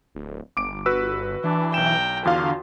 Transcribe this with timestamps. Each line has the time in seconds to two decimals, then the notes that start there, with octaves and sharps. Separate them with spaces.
0.15 D1
0.57 G1 D6 D7
0.86 F#4 B4 E6
1.44 E3 D4
1.74 B1 G5 A#5 E7
2.25 E2 D3 F4 F#4 F5